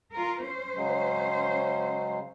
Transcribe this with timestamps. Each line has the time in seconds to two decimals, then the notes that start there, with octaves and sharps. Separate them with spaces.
0.13 F4 A#4
0.44 C#4 C5
0.77 C#3 F#3 G#3